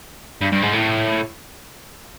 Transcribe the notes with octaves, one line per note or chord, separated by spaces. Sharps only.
G2
G2
G#2
A2